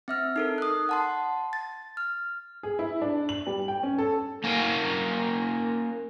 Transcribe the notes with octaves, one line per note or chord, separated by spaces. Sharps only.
C4 E5 F6
D#4 A4 A#4
D#6 F#6
F#5 A5 C6
A6
F6
G#4
E4
D4
F#7
G3
G5
C#4
A4
A#3 C#4